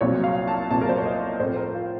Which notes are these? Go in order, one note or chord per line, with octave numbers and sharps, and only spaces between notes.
C2 A#2 F#3 C4 C#5
F5
A5
C2 A#2 F#3 C4 A5
A#4
C5
C#5
D#5
A2 F3 C4 C5
A#4
F4